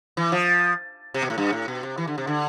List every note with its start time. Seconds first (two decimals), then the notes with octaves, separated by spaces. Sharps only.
0.17 E3
0.32 F3
1.14 C3
1.22 B2
1.30 A2
1.38 G2
1.53 A2
1.68 B2
1.83 C3
1.98 E3
2.07 D3
2.18 C3
2.27 D3